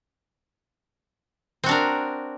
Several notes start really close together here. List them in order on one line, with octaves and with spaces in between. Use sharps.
C4 F#4 D4 A#4